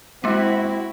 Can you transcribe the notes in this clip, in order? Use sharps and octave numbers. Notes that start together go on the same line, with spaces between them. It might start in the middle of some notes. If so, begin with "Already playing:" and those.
G#3 A#3 C4 E4 F#4